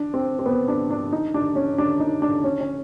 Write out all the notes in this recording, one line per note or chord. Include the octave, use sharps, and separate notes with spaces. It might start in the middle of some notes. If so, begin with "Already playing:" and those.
Already playing: D4
C4
C4
B3
D4
D4
D#4
D4
C#4
D4
D#4
D4
C#4
C#4